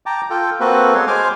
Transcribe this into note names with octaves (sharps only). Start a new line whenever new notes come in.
G5 A5 A#5 D6
F4 A4 G5
A#3 C4 F#4 A4 B4
G#3 B3 C#5 C6
G#3 C5 G#5 C6 D6 F6